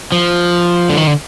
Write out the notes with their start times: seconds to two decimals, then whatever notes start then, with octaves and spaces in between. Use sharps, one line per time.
0.12 F3
0.90 D3
0.97 D#3
1.07 D3